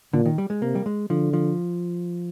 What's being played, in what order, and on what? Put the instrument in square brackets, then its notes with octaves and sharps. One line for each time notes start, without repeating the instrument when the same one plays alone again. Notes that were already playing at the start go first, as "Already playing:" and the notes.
[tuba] A#2 [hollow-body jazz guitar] D3
[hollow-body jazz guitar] D#3
G3
G#3
[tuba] C3 [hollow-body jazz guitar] A#3
[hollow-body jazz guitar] G3
G#3
[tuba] D3 [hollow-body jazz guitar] F3
[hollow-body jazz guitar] F3